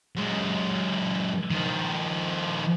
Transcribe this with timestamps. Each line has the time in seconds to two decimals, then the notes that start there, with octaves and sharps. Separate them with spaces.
0.16 F#2 G#3
1.51 D#3 F3